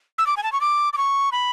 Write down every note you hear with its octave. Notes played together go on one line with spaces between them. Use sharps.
E6
D6
G#5
A5
C#6
D6
D6
C#6
B5